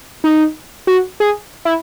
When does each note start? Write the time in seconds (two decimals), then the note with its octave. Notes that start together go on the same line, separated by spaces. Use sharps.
0.24 D#4
0.87 F#4
1.20 G#4
1.65 E4